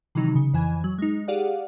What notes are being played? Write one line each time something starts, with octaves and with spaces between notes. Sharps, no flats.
C3 D#3 E3 F#3 D#4
C#3
F2 E3 G#5 G#6
F#3
G#3 D#4
G4 G#4 D5 F5 F#5